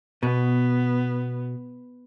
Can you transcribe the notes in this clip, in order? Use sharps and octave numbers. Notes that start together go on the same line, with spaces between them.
B2 B3